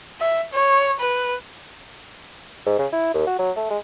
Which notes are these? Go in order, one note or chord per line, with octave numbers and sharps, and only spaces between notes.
E5
C#5
B4
G#2
C#3
E4
D#2
F#4
F#3
A3
G#3